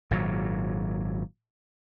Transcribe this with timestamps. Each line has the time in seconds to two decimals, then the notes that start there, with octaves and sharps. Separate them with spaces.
0.11 G#1 A#2 F#3